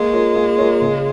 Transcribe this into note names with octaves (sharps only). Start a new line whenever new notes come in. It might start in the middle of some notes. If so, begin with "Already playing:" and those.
Already playing: G#3 A#3
F4 A#4 C#5
A#3
F4 A#4 C#5
C#3